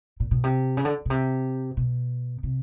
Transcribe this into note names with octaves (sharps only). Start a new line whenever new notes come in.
A#2
B2
C3
C#3
D3
B2
C3
B2
C3